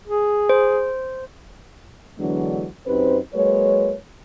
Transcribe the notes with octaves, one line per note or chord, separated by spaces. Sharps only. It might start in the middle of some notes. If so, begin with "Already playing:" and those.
G#4
C5
D3 E3 F#3 G#3 B3 D4
F#2 C4 D#4 G4 B4 C5
F#3 G#3 A#3 B4 C#5